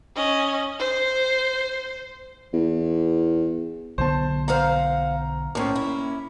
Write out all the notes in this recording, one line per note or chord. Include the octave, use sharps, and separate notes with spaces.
C#4 D#5
C5
E2
B1 D3 B3 C5 A5
C5 F5 F#5 A#5 F6
A2 A#3 C4 C#4
E4